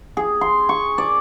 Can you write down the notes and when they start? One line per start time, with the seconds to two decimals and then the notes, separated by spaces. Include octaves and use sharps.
0.17 G#4
0.41 C6
0.69 C#6
0.98 D5